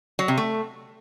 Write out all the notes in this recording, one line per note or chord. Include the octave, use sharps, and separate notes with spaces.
F#3
C3
A3